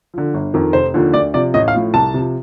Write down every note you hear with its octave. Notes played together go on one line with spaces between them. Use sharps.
D3 F3
G1
F2 D#3
F1 C5
D#2 D3 F3
D2 D5
C3 F3 D5
A1 D#5
F5
A2 F3
C2 A5
C3 F3